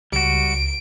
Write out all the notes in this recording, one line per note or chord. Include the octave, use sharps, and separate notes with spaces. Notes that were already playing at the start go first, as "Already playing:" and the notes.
C#2 G3 F#4 D7